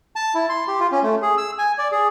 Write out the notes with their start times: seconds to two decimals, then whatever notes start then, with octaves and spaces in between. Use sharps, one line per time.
0.16 A5
0.35 E4
0.49 C6
0.68 G4
0.80 F4
0.92 C#4
1.03 A3
1.22 G#4
1.38 E6
1.59 G#5
1.78 D5
1.92 G#4